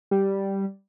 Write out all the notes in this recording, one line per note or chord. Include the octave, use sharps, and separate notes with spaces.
G3